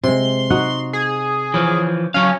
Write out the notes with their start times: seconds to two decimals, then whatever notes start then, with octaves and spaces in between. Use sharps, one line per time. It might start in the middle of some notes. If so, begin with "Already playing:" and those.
0.03 C3 G#3 C6
0.50 D#4 F#4 F#5
0.93 G#4
1.54 E3 F3 C#5
2.14 F#3 C#4 F5